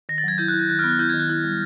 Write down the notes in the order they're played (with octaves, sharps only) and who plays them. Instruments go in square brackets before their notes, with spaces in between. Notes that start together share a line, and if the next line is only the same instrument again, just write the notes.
[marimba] D#3 [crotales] A#6
[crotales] A6
[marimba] F#3 [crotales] G#6
[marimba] E4 [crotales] G6
[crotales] F#6
[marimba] E4
[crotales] G6
[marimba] D#3 [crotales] F#6
[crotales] F6
[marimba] B3
[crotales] F#6
[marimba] E4 [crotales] G6
[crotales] G#6
[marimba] D#3
[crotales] F#6
[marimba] E4
G3